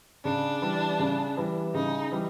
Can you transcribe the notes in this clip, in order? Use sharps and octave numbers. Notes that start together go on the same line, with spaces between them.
C#3 D4
E3 G3
C#3
E3 G3
C#3 D#4
E3 G3